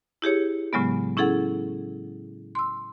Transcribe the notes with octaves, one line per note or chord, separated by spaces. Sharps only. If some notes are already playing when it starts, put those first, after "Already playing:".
E4 G4 G#4 C#5
A2 C#3 F#3 G#3 B3
C#4 E4 G#4 A4 F#5
C6 E6